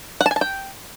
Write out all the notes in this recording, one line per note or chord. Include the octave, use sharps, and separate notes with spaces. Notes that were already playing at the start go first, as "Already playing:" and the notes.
F#5
A5
G#5
A5
G5